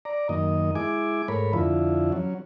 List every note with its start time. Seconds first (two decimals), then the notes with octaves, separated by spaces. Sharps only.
0.05 D5 A#5
0.29 F#2 D#3 A#3 D#5
0.75 G#3 E4 G#5 D6
1.28 G#2 A3 A#4 C#5 B5
1.53 F2 D3 F3 E4
2.12 F#3 C#4